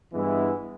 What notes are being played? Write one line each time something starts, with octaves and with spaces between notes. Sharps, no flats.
G2 E3 G#3 B3 E4